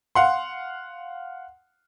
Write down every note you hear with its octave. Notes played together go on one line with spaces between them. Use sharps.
F5 F#5 C6